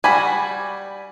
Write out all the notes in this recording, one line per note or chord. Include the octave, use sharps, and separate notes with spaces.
G3 F#4 G#5 B5